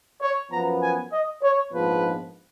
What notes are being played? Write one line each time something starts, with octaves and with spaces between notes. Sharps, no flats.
C#5
F#2 F3 B3 A#5
G#5
D#5
C#5
A#1 G#2 F3 B3 B4